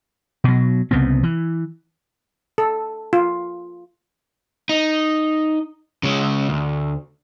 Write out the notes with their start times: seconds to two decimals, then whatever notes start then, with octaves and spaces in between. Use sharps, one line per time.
0.44 B2 F#3
0.91 C2 C#3 B3 C4
1.23 E3
2.58 A4
3.13 F4
4.69 D#4
6.03 C#3 G#3
6.49 D2